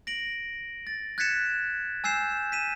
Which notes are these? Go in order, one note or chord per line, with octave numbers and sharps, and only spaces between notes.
A#6 D7 F#7
A6
F#6 G#6 A6 B6 C#7 E7
G#5 E6 G6 C7 E7
B6 D#7 E7